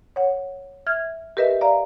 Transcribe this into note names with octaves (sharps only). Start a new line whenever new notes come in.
C#5 F#5
E5 F6 G#6
G4 A#4 B4 D#5 E5
D5 F5 A#5